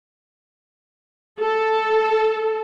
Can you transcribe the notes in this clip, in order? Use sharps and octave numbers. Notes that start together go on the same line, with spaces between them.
A4